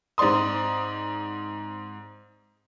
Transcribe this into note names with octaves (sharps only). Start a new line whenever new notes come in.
G#2 C4 D5 C6 D#6